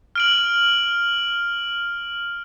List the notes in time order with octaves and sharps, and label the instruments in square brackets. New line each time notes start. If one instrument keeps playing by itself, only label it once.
[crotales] F6 D7 F#7